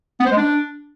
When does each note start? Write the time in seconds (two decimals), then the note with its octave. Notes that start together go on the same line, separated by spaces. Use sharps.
0.20 B3
0.26 C5
0.31 G#3
0.37 D4